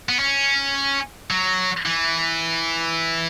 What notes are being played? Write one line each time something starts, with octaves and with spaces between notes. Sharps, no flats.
B3
C#4
F#3
E3